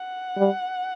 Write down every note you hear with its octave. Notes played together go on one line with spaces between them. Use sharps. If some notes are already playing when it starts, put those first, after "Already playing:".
Already playing: F#5
G3